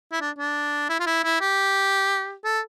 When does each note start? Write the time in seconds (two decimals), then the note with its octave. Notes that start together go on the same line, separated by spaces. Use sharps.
0.12 E4
0.21 D4
0.39 D4
0.90 E4
1.00 F4
1.07 E4
1.24 E4
1.41 G4
2.44 A4